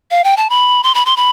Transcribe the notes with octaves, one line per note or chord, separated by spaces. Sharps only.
F5
G5
A5
B5
C6
B5
C6
B5